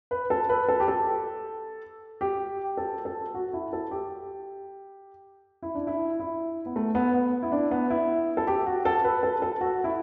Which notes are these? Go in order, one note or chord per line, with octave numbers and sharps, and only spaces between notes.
B4
A4
B4
A4
G4
A4
G4
A4
A4
F#4
E4
A4
G4
E4
D4
E4
E4
B3
A3
B3
B3
E4
D4
B3
E4
A4
G4
F#4
A4
B4
A4
A4
F#4
E4